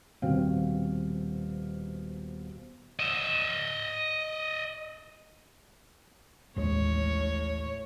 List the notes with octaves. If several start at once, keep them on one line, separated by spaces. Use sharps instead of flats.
D#1 B2 C4 F#4 F5
D#5 E5
A1 D#2 A2 G#3 C#5